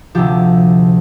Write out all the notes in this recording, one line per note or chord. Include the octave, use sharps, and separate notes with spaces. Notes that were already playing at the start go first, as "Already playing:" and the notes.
D2 C3 F3 G4